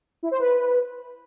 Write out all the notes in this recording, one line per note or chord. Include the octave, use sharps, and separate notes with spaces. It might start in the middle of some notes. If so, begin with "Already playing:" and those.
E4
C5
B4